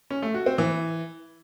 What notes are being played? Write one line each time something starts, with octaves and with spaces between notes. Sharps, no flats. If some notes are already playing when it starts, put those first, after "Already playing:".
C#4
A3
F#4
C4
E3